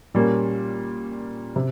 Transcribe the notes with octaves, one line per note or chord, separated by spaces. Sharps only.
A#2 G3 A#3 C#4
C3